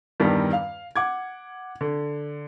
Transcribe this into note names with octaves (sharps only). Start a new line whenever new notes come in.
E2 G2 D#3 G3
F5
F#5 D6 G#6
D3